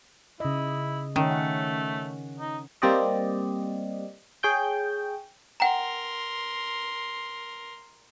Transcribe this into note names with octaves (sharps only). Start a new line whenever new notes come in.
C#3 E4 D#5
D#3 A3 C#4
F#5
D#4
G3 A#3 C4 G4 D5 D#5
G#4 C#5 G5 G6
A#4 F#5 G5 A#5 C6